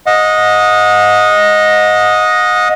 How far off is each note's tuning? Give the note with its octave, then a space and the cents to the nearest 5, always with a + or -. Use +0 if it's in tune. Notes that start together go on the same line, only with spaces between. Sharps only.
D#5 +0 F#5 -35